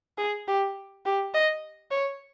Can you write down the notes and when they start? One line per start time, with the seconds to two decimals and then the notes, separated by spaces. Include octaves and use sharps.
0.18 G#4
0.48 G4
1.06 G4
1.34 D#5
1.91 C#5